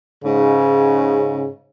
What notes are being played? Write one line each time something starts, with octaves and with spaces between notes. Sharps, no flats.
G#2 C#3